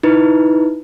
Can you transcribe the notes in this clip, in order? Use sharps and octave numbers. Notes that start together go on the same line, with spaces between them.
D#4 E4 B4